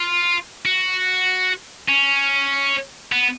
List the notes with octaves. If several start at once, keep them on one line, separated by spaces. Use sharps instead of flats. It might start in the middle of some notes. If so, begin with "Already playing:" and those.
Already playing: F4
F#4
C#4
B3